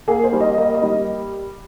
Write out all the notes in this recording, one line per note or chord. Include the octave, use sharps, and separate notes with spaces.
A#3 G#4
C5
G3
D#5
A#3 D#5
D#5
G3